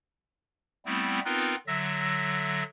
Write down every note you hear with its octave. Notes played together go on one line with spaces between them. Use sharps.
G3 A3 B3 C4 E4
B3 C4 D#4 F4 A#4 B4
D3 F#3 E5 E6 A#6